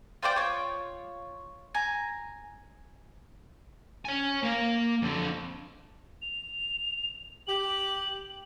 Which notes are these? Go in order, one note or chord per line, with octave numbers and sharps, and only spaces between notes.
F4 C5 D5 G5
F4 C#5
G#5 A#5
C#5 G#5
A#3 F5
F2 D3
F7
G4 F#7